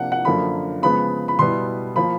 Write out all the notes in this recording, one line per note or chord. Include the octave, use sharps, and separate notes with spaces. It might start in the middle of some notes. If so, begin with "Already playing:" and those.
Already playing: C3 F3 A#3 D4 F#5
F#5
F#2 D3 F3 A#3 B5
C#3 F3 G#3 B3 B5
B5
B2 G3 B3 E4 C6
F3 A#3 B5